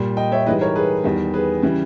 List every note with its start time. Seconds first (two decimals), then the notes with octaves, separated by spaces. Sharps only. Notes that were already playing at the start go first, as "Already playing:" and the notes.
Already playing: A#2 G3
0.17 D#5 G5
0.32 C#5 E5
0.46 G#2 E3 G3 B4 D#5
0.61 A#4 C#5
0.76 G#4 B4
1.04 E2 D#3 G3
1.34 G#4 B4
1.62 C#3 E3 G3